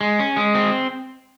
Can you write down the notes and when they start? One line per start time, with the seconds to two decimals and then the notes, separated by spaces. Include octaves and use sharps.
0.01 G#3
0.19 C#4
0.37 G#3
0.55 C4